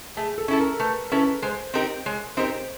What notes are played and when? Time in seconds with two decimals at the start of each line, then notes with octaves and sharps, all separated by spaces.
0.17 A3 G#4
0.38 A4
0.48 C#4 E4 A4
0.60 A#4
0.80 A3 B4
1.12 C#4 E4 A4 B4
1.42 G#3 C5
1.74 C4 D#4 G4 A#4
2.06 G#3 C#5
2.37 C4 D#4 G4 A#4 C5